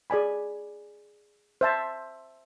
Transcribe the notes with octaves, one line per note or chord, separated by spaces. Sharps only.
G#4 D5 G#5 B5
C5 E5 A5